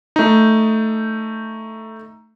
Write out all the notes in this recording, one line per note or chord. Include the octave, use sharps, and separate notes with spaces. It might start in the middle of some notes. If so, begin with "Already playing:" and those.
A3 D#4